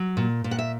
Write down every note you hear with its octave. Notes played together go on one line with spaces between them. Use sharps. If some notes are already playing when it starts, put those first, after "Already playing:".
Already playing: F#3
A#2
A#2
F#5
E5